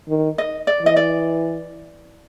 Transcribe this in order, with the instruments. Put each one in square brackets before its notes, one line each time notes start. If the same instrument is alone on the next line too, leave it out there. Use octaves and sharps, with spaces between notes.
[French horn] D#3
[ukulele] D#5
D5
[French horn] E3 [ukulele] D#5
[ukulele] D5